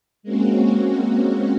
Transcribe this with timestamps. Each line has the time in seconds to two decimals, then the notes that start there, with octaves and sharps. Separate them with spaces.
0.23 G#3 A#3 C4 C#4 F#4